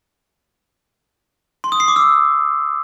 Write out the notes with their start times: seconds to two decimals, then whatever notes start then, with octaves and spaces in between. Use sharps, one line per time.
1.64 C6
1.72 D#6
1.80 C7
1.88 D6
1.96 E6